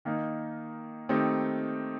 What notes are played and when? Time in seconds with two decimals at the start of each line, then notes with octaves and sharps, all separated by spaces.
0.05 D#3 A#3 D#4
1.09 D#3 A3 C4 D#4 G4